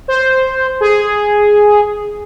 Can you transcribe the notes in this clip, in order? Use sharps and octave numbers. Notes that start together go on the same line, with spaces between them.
C5
G#4